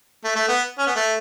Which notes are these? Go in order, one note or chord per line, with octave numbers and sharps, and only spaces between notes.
A3
A3
B3
C#4
B3
A3